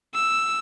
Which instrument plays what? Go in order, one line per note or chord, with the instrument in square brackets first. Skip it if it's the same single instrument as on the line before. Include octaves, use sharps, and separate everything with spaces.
[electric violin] E6